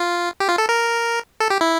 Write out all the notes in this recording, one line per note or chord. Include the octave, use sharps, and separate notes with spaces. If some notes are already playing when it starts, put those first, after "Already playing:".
Already playing: F4
G4
F4
A4
A#4
A4
G4
E4